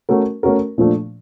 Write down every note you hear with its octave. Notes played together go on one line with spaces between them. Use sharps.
A3 C#4 F#4 A#4
A3 C#4 F#4 A#4
A#2 F3 A3 D4